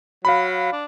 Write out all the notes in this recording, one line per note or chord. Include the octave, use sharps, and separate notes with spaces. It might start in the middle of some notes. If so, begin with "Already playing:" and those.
F#3 F5 B5
D4